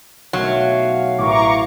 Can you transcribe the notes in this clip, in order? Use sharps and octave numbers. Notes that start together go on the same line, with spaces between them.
B1 F#3 A3 F5
A1 A#5 C#6 D6